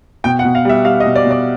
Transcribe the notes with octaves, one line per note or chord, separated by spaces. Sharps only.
B2 G5
F#5
B2
F5
G3 E5
G3 F5
D#5
B2
D5
B2
D5